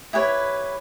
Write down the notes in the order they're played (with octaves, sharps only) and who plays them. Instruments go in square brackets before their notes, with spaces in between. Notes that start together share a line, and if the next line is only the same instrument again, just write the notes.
[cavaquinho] E4 G4 B4 C#5